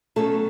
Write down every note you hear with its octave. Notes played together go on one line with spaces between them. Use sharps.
B2 F#3 A3 C#4 A4